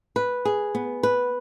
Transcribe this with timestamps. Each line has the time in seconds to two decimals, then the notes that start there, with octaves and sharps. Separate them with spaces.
0.16 B4
0.45 G#4
0.75 B3
1.03 B4